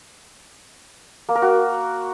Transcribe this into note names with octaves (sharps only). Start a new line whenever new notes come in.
A#3
A#4
F#4